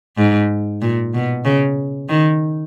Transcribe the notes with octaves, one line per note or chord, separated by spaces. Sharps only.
G#2
A#2
B2
C#3
D#3